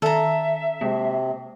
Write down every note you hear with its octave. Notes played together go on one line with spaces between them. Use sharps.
D#3 A4 E5 A#5
C3 G#3 A#3